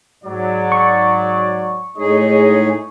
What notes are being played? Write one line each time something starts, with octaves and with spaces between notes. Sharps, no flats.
G#2 F#3 D5
C#6
A2 G#3 D#4 G#4 C#5 D#5